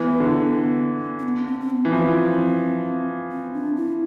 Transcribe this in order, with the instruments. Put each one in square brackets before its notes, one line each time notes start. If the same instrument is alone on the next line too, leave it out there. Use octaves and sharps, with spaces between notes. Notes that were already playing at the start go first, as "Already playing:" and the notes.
Already playing: [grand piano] E3 [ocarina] B3
[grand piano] D3
[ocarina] C4
B3
C4
C4
B3
[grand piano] E3
[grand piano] F3 [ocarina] C4
[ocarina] C4
D4
E4